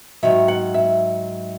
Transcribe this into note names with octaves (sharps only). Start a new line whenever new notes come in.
G#2 D#3 F#3 E5
F#5
E5